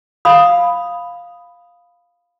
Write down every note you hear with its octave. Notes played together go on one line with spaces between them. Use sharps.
F5 B5 D#6